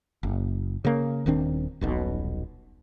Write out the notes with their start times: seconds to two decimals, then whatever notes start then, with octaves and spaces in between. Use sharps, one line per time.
0.23 F#1
0.85 C#3 A#3
1.26 D#1 D#3 C4 D4
1.81 D#1 B1 B2